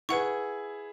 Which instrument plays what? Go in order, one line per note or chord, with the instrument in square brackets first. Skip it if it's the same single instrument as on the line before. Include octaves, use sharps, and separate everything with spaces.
[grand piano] E4 G#4 [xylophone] B4 F#5 C#6